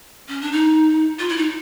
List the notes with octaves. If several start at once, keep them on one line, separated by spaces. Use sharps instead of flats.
C#4
D4
D#4
F4
E4
D#4